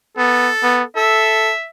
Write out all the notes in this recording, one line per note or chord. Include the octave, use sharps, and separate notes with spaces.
B3 A4
B3
A4 E5